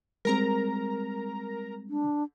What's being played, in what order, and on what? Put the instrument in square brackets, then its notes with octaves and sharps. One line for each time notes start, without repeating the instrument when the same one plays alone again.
[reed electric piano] G3 G#3 C4 [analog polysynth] A#4 A#5
[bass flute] D4